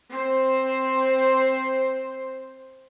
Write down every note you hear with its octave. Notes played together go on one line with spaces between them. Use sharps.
C4 C5